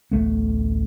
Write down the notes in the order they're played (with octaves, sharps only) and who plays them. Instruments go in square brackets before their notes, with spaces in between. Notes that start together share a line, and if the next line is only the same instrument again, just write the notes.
[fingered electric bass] A1 D2 A3 B3